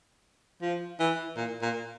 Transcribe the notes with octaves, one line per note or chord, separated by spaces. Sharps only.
F3
E3
A#2
A#2